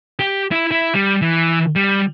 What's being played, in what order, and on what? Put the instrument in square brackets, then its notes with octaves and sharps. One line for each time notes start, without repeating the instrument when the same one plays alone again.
[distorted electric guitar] G4
E4
E4
G3
E3
G3